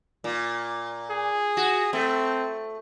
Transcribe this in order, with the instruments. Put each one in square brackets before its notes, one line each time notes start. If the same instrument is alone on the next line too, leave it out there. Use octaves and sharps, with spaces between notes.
[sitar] A#2
[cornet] G#4
[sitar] F#4
[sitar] A3 [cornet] C4